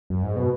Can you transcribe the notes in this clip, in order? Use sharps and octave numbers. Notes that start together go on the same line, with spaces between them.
F#2
G#2
B2